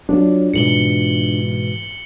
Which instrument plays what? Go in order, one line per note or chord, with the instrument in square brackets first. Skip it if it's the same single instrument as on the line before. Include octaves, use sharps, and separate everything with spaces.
[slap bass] F#3 [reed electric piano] D4 F4
[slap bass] G#2 B2 E3 [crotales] C#7 F#7 G7